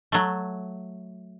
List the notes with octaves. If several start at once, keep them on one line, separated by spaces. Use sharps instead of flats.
F#3 A3